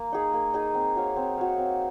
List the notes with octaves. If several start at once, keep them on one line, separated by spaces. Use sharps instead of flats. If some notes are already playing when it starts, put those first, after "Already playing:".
Already playing: A#3
D#4 G#4
A#3
D#4 G#4
C4
F#4 C#5 F5
C4
F#4 C#5 F5
C4